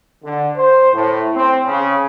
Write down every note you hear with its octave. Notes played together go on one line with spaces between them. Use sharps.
D3
C5
A2
C4
C#3